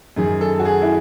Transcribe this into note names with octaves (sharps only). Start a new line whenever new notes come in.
F#2 D#3 G#4
A4
F#4
G#4
E4